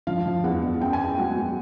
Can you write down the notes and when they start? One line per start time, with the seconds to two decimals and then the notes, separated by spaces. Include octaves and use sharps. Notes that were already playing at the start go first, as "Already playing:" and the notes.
0.07 F3 F5
0.25 F3
0.44 E2 F#5
0.63 E2
0.81 F#2 G5
0.93 G#5
1.00 F#2
1.06 G5
1.18 F#3 F#5
1.37 F#3